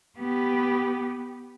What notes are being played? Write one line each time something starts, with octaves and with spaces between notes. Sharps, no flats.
B3 G4